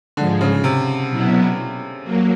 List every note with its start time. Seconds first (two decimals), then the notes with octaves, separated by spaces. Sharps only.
0.17 G#2 D3 F3 G#3
0.41 C#3
0.64 C3
1.10 B2 F#3 B3 E4
2.03 F#3 A#3